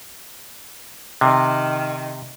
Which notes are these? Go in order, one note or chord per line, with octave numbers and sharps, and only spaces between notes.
C3 D#3